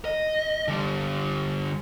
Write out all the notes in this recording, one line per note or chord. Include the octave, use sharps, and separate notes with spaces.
D#5
D3 G3